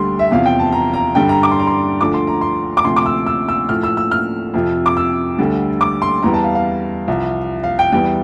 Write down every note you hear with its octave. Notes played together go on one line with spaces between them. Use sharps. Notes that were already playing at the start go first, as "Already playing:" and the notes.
Already playing: D2 D3 G3 C6
E5
E2 C3 F3 F5
G5
A5
A#5
A#5
G2 D3 G3 G5
A#5
D6
C6
A#5
C6
D2 D3 F3 D6
C6
A#5
C6
D6
D2 C3 F3 C6
D6
E6
E6
E6
A2 F3 F6
E6
E6
F6
F2 C3 F3
D6
E6
D2 D3 G3
D6
C6
E2 E3 G3 A#5
A5
F5
F5
C2 C3 F3
F5
G5
E2 E3 G3 G5